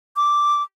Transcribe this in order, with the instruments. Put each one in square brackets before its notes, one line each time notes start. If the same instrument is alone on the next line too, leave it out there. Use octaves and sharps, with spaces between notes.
[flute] D6